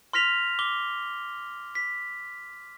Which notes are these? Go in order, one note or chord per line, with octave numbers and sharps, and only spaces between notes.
C6 F6 A#6 B6 F7
D6 G7
B6